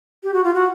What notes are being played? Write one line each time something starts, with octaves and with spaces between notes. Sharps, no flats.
G4
F#4
F4
F#4